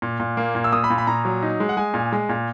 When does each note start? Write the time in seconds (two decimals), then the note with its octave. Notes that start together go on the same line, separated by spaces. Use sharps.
0.02 A#2
0.20 A#2
0.37 A#3
0.55 A#2
0.64 E6
0.72 A#2 D#6
0.84 B5
0.90 A#2
0.98 B5
1.07 A#2 A#5
1.25 F#3
1.43 D#4
1.60 G#3
1.69 F#5
1.77 G#3 G#5
1.94 A#2
2.12 G#3
2.29 A#2